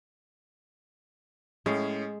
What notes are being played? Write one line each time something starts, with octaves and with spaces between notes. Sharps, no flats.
A2 G#3 C#4